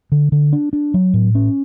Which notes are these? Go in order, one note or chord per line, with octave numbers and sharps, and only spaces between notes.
D3
D3
D4
D4
F#3
A2
C#4